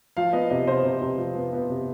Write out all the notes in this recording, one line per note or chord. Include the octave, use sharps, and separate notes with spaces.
F3 F5
B3 D#5
C3 D#5
C3 C5
C3
C3
F3
B3
B3
C3